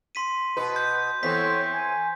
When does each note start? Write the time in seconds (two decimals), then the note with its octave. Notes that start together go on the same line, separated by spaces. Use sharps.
0.15 C6 B6 D#7
0.57 B2 B4
0.76 G6
1.23 E3 B3 C4 A4 C#5 B6
1.73 G#5